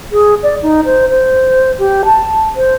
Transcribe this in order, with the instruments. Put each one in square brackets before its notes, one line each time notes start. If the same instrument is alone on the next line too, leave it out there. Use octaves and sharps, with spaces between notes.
[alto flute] G#4
D5
D#4
C5
C5
G4
A5
C5